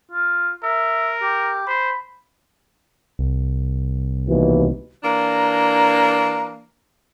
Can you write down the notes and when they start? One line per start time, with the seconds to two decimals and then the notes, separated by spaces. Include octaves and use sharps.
0.12 F4
0.64 A#4 E5
1.22 G4
1.67 C5 B5
3.19 C2
4.27 D#2 B2 E3
5.04 E3 A#3 D4 A#5